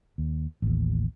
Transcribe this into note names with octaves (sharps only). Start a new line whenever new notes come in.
D#2
A1 D#2